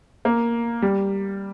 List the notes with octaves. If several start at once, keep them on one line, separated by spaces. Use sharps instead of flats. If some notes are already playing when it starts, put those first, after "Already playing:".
A#3
G3